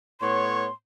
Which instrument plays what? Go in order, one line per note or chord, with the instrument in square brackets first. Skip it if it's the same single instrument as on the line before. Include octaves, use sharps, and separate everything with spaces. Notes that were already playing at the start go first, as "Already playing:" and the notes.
[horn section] A2 B3 C#5 [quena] C6